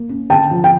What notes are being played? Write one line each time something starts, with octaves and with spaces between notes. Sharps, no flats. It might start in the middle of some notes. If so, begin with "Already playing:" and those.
Already playing: A#3
C#4
D3 G5 A5
F3
G5